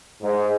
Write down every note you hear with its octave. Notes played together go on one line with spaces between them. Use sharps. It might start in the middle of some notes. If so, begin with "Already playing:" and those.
G#2